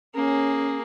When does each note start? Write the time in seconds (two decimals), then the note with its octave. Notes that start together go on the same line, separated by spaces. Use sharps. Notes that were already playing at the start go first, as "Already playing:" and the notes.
0.15 A#3 C#4 G#4